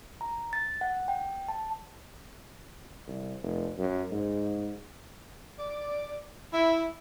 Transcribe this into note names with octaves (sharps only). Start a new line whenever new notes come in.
A#5
A6
F#5
G5
A5
C2
F1
F#2
G#2
D5
E4